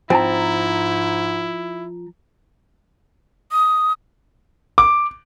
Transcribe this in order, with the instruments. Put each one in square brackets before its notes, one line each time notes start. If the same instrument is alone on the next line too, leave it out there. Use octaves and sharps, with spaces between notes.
[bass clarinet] G#2 [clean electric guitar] F3 G#5 A#5 [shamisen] C4 [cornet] E4
[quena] D#6
[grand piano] D6